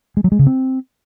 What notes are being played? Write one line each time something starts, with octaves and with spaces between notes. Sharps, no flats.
G#3
F#3
G#3
C#3
C4